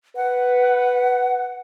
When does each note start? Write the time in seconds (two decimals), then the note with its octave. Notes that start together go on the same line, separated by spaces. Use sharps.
0.16 B4 F#5